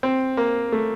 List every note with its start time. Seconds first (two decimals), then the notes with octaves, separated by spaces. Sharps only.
0.03 C4
0.37 A#3
0.72 A3